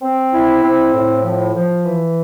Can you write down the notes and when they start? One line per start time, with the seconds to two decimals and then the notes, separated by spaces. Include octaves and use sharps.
0.02 C4
0.33 E4
0.63 C4
0.94 A2
1.24 F3
1.55 F3
1.85 E3